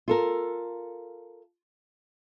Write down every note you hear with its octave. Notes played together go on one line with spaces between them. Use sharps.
F4 A4 A#4